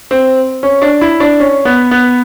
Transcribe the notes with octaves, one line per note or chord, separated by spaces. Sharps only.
C4
C#4
D4
E4
D4
C#4
B3
B3